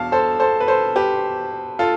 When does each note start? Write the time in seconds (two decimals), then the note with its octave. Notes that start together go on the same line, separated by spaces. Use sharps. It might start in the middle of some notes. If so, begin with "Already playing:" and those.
Already playing: E2 B2 F5 A5
0.12 A4 C5
0.40 A4 C5
0.60 B4
0.68 A4 C5
0.96 G4 B4
1.79 F4 A4